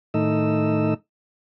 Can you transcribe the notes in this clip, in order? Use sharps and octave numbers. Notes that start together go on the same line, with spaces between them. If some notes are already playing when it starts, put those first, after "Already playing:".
A2 D#3 A3 D#4 D#5 E6